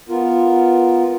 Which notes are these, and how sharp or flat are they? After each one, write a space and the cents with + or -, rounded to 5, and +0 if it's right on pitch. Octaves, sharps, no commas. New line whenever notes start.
B3 +0 F4 +0 A#4 +0